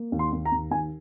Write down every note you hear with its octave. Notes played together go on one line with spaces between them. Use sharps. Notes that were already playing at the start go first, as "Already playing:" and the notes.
Already playing: A#3
D#2
C6
D#2
A#5
D#2
D#2 G#5